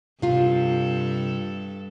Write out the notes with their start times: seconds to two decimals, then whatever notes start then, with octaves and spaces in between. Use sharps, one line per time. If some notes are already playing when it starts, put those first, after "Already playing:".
0.22 G2 C3 F4 A4